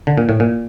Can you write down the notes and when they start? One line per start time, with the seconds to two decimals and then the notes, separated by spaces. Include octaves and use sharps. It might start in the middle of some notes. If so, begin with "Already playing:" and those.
0.07 D3
0.18 A#2
0.29 A2
0.40 A#2